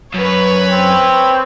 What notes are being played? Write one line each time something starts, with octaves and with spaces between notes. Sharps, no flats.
F#2 B4 C#5
C4